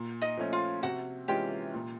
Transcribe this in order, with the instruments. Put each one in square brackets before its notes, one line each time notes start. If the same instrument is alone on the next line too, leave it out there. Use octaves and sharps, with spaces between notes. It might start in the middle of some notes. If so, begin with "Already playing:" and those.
Already playing: [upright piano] A#2
[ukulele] D#4 D#5
[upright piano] F3 A3 C#4
[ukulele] F4 F5
[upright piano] C3 [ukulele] F#4 F#5
[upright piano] E3 G#3 C#4 F4 [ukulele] G4 G5
[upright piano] A#2